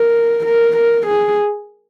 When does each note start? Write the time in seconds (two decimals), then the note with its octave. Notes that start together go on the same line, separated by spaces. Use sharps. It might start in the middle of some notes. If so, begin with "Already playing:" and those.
Already playing: A#4
0.46 A#4
0.77 A#4
1.07 G#4